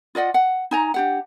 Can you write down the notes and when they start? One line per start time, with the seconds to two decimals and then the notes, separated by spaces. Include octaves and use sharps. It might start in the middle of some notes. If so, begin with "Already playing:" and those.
0.15 F4 D5 D#5 F#5
0.34 F#5
0.71 D#4 G#5 A#5
0.94 D4 G4 F#5